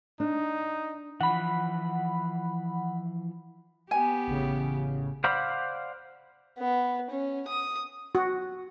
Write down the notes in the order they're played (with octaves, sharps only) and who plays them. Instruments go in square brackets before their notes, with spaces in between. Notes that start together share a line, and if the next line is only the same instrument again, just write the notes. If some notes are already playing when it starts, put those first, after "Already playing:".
[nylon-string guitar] D4 [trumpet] D#4
[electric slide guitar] E3 F3 [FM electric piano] F#5 B5
[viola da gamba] B3 G4 [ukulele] G#5
[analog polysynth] A1 C#3
[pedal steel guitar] C5 D5 F5 F#5 B5
[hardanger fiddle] B3
C#4
D#6
[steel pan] F#4